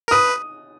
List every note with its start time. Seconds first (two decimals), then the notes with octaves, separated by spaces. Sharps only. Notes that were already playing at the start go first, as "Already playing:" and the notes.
0.08 A#4
0.11 B4 D#6